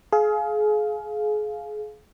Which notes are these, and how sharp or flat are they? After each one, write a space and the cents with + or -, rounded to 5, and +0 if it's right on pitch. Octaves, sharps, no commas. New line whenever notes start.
G#4 +30 F5 +0